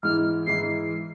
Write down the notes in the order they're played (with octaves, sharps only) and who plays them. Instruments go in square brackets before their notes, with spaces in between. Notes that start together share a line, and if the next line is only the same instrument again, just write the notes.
[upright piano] G#2 E3 G#3 E4 [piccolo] F6
[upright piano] G#2 E3 G#3 E4 [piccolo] C7